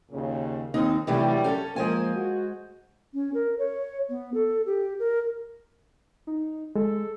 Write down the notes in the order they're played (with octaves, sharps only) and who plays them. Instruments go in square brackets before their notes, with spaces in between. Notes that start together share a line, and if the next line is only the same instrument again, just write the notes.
[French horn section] D#2 A#2 C#3
[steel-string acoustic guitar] D#2 D#4 [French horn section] C4
[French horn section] G2 F#3 G3 [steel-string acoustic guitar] C3 E3 A3
[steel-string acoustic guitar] C#4 A4
[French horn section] F3 A#3 [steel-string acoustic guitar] G#3 C5 G#5
[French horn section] F#4
[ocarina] C#4
A#4
C#5
B3
A4
G4
A#4
[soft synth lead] D#4
[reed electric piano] G#3 [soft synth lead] A4